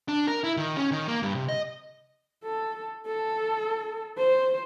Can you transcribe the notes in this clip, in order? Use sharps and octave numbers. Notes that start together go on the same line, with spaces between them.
D4
A#4
E4
D#3
C#4
D#3
A#3
G2
C3
D#5
A4
A4
C5